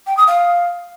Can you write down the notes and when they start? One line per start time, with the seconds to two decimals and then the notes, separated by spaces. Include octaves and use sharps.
0.07 G5
0.17 D#6
0.27 F5